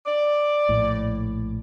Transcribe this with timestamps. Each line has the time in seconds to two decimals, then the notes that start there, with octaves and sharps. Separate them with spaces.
0.07 D5
0.69 A#1 A2